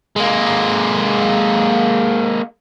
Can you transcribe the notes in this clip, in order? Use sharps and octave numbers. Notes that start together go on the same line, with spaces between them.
G#3 A#3